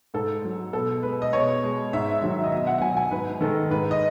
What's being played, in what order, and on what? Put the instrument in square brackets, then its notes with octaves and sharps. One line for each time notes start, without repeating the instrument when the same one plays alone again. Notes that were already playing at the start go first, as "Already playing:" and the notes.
[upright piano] G#2 A4
F#3
B2 A4
G#3 B4
D#5
B2 C#5
G#3
G#2 E5
D#3 F#3 E5
D#5
B2 E5
F#5
F#5
F#3 G#5
G#5
G#2 B4
D#3 G#3 A4
G#2 B4
D#5